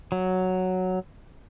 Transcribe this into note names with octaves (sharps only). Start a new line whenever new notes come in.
F#3